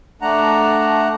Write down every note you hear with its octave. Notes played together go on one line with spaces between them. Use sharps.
A3 D4 F#5 A#5